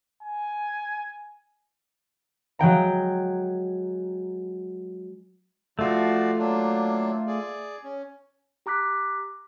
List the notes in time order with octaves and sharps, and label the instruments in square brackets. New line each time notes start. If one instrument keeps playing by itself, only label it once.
[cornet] G#5
[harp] F#3 G#3 G5 A#5
[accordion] F3 F#4 D5 [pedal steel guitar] A3 F4
[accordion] F#3 A#3 D4
G#4 D5
C#4
[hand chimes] G4 A#5 D6 F#6 B6